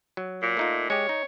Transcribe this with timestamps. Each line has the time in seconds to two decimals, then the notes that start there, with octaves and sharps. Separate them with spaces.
0.17 F#3
0.42 A#2
0.57 A3 D#4 F4
0.90 G#3 G4 C#5
1.09 D#4